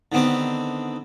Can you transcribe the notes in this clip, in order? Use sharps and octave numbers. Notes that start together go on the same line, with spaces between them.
D3 D#3 B3 C4 G4